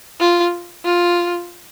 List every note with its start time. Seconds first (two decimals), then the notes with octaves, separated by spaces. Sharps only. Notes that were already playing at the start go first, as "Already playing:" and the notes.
0.20 F4
0.84 F4